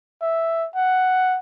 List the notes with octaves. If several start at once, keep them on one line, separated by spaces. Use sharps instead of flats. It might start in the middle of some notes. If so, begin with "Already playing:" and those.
E5
F#5